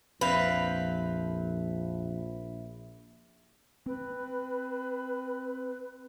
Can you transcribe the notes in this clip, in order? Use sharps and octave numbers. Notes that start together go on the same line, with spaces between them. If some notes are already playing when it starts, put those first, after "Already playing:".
A#1 F2 C4 B4 E5 F5
C4 B4